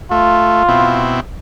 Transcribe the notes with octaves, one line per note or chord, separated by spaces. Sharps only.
A3 F4
B2 C4 E4